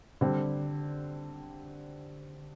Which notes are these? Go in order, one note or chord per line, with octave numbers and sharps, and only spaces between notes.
D3 G3 C4